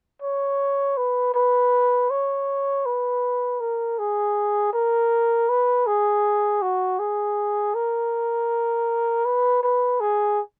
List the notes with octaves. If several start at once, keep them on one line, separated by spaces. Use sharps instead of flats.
C#5
B4
B4
C#5
B4
A#4
G#4
A#4
B4
G#4
F#4
G#4
A#4
B4
B4
G#4